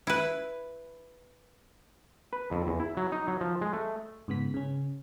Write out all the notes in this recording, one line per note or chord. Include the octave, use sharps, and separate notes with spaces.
E4 B4
B4
F2
E2
E4
F#3
D#4
F#3
F3
G#3
A3
G#2 C#3 B3 B6
C#3 C#4